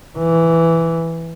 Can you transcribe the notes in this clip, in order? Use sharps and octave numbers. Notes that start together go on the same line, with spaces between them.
E3